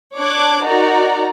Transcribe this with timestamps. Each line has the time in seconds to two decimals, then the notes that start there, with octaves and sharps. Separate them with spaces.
0.18 D4 C#5 D6 F#6 G#6
0.65 D#4 F#4 A#4 D5 A#5